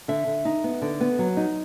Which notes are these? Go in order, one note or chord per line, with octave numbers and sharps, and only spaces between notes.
D3 E5
D3
D#4
B3
D3
B3
F#3
D#4